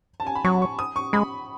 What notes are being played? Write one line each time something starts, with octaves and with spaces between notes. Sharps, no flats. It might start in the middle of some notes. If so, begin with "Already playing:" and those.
A5
G#5
B5
F#3 C#6
C#6
D#6
C#6
G#3 B5